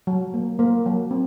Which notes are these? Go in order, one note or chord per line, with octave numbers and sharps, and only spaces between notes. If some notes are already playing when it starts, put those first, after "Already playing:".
F#3
A#3
A#3
F#3
C4